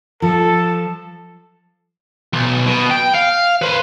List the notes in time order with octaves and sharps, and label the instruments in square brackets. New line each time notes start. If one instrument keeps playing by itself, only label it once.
[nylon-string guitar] F3 [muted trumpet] A4
[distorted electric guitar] B1
B2
G5
F5
B4 C5